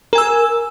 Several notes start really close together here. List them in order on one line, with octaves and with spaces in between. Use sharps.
A#4 G#5 E6